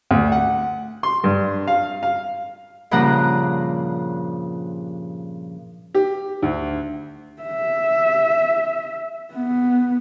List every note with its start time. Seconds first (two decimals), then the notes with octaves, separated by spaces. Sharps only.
0.11 D2
0.32 F#5
1.03 C6
1.24 G2
1.68 F5
2.03 F5
2.91 G2 A#2 C#3 F3 F#5 A#5
5.94 G4
6.43 D2
7.43 E5
9.33 B3